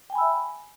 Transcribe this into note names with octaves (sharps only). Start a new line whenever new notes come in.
E5 G5 G#5 B5 E6